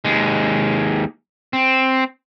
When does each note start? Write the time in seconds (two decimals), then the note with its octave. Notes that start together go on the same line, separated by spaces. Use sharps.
0.05 D#2 G#3
1.53 C4